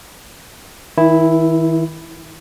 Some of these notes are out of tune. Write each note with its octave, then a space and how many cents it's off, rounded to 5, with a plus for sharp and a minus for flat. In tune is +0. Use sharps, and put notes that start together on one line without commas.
D#3 +45 E4 +0